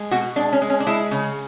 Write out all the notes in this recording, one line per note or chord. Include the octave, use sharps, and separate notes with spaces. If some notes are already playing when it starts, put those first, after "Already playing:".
Already playing: G#3
B2 F#4
G#3 D4
C#4
G#3
C#4
D4
G#3 E4
C#3